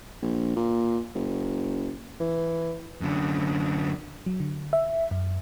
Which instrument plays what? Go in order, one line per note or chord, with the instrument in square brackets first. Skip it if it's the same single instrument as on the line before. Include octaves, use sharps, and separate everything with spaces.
[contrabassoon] A#1
A#2
F#1
E3
[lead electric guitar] F#2 D3
[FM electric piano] F#3
D3
E5
F#2